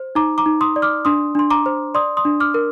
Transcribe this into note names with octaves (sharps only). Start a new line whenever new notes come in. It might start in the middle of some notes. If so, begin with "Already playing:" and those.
Already playing: C5
D#4 A#5 D6
A#5 D6
D#4
C6 D#6
D5
D6 F6
D4 C6 D#6
D4 C6
A#5 D6
C5
D5 C6 D#6
C6 D#6
D4
D6 F6
A#4